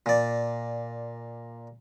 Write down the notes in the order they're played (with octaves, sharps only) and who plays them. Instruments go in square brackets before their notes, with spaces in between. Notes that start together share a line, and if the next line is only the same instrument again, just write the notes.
[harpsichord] A#2 D5